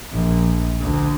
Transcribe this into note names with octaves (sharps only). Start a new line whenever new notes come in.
A#1
D2